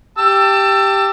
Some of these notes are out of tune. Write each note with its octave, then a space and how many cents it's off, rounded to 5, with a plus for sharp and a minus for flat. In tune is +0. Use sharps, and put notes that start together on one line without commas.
G4 +0 A5 +25 E6 +20